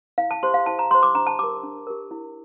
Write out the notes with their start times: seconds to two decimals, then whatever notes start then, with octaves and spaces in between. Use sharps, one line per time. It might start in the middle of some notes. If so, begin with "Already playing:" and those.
0.18 E4 F5
0.31 A5
0.43 G4 C5 C6
0.54 F5
0.66 E4 A5
0.79 A#5
0.91 G4 C5 C6
1.03 D6
1.15 D4 A#5
1.27 A5
1.39 G4 A#4 D6
1.64 D4
1.87 G4 A#4
2.11 E4